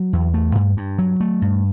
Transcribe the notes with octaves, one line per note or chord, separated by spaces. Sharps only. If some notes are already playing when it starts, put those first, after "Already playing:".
Already playing: F#3
E2
A3
G2
G2
F#3
A3
G2